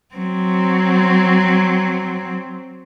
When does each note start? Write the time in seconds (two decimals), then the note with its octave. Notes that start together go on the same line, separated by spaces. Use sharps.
0.15 F#3 C4